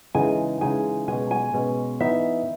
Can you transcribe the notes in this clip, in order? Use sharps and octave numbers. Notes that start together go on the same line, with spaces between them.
C#3 E3 G#3 D#4 G#5
C#3 E3 G#3 D#4 G#5
B2 G#3 C#4 G#5
G#5
B2 G#3 C#4
E3 B3 D#4 E5